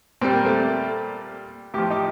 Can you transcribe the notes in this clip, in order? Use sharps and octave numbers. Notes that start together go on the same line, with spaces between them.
A#2 G3 C4
A#3
A3 C4
A2 F3 F4 G4
D#4 G4